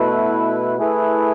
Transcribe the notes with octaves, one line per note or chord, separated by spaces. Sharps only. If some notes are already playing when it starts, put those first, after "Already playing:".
Already playing: B2 A3 E4 B4
A3 E4 G#4 B4